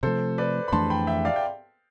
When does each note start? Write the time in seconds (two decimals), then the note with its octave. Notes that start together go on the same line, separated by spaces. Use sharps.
0.03 C3 F3 A3 A4 C5
0.38 B4 D5
0.68 B5
0.72 F2 E3 A3 D4 A5 C6
0.90 G5 B5
1.07 E5 G5
1.25 D5 F5
1.36 G5